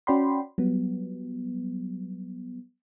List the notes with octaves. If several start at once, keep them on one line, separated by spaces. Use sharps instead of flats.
C#4 F#4 D5 G5 B5 C6
F#3 G3 B3